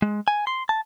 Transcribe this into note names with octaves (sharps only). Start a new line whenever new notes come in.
G#3
G#5
C6
A5